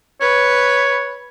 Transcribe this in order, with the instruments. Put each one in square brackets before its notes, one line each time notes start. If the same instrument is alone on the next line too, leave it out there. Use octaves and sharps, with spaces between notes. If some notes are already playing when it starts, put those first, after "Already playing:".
[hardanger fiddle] B4 [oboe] C#5